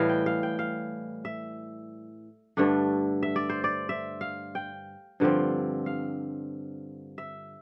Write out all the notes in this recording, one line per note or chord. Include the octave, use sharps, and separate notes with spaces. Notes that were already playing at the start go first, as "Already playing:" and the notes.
Already playing: A2 E3 G3 F5
G5
F5
G5
F5
E5
G2 D3 A3 D4
E5
D5
C5
D5
E5
F5
G5
G2 D3 F3 C4
F5
E5